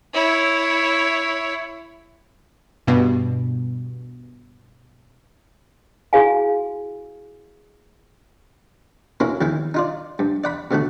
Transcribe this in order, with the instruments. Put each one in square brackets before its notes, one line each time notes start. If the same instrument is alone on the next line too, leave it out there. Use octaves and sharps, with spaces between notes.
[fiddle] E4 C#5
[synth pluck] G2 B2
[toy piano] E4 F#4 G#4 F5 G#5
[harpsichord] A#3 C#4 E4 F#4 A#4
E2 D#3 E3 E4
D#4 F4 D5
G2
D5 F#5 B5
B2 D3 A3 F#4